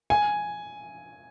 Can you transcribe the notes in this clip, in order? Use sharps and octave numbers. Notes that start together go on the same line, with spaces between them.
G#5